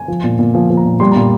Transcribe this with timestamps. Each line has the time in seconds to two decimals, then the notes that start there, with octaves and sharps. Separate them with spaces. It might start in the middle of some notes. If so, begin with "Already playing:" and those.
Already playing: G#5
0.08 F3
0.24 A#2
0.39 A#2
0.54 F3 G#5
0.70 F3
0.77 A#5
0.85 A#2
1.00 G3 C6
1.12 A#5
1.16 A#2